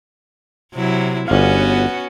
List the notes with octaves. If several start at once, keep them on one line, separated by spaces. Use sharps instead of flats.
C3 F#3 E4
G1 B3 C#4 F#4 F5